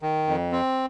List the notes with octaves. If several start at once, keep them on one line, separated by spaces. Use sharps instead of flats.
D#3
F2
C4